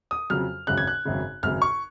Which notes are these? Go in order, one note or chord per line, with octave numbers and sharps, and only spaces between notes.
D#6
F2 C#3 F#3 F6
G#1 F#2 C#3 F#6
G#6
F#6
G#1 F#2 C#3
G#1 F#2 C#3 F6
C#6